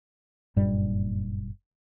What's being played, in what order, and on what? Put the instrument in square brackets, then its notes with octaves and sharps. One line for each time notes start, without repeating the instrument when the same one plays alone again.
[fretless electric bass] F#1 G2 A#2 G3